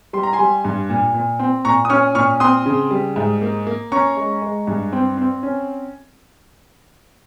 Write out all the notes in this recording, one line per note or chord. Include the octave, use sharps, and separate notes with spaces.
G3 C6
A#5
G#5 C6
G3
G2
A#2
A#2
C4
A#2 A#5 C#6
D#6
C#4 C#6 F6
A#2 C#6 F6
C4 C6 D#6
C#3
G3
G#2
A#3
A#3
C#4 A#5 C#6
G#3
G#3
G2
C4
C4
C#4